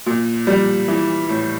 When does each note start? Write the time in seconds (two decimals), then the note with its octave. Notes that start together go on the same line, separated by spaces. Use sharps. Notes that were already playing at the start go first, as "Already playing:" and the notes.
0.06 A#2
0.47 G3
0.88 E3
1.29 A2